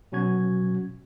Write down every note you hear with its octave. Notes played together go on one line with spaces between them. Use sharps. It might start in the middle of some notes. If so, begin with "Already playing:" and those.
B2 F#3 C#4 F#4 G#6